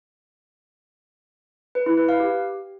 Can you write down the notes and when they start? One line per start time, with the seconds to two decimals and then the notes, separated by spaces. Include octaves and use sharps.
1.75 B4
1.86 E4
1.97 B4
2.09 F5
2.20 G4